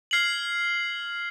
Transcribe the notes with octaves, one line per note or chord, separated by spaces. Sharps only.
F6 G#6 C7 F#7